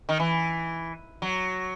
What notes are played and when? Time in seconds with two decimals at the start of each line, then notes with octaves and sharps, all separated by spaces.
0.09 D#3
0.20 E3
1.22 F#3